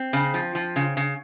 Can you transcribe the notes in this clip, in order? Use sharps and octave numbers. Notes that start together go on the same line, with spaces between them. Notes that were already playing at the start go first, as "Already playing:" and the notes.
Already playing: C4
C#3
F3
F3
C#3
C#3